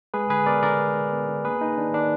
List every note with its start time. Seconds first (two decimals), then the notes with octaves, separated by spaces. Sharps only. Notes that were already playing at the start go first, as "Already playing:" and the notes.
0.14 G#3 G#4 B4
0.30 D3 G#4 B4
0.46 B3 A#4 D5
0.63 D3 A#4 D5
0.79 G#3
0.95 D3
1.12 B3
1.28 D3
1.44 A#3 G#4 B4
1.61 A#3 D#4
1.77 D#3 D4
1.94 D#3 D4